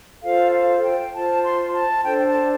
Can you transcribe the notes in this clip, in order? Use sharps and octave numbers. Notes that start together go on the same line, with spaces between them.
F4 A4 C5 F5
F5
G5
F4 C5 A5
C6
A5
D4 A4 C5 G5
G5
A5